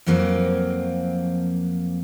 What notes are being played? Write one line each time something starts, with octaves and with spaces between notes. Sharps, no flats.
F2 F3 F#3 A#3 C4